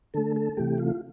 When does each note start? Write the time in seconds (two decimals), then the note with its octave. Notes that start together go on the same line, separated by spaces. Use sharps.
0.14 D3 A3 A4
0.36 A4
0.57 C3 E3 A3 G4
0.78 F4